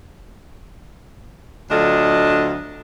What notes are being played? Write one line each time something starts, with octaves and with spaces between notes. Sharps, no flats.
D2 F#3 D4 F4 A4 D#5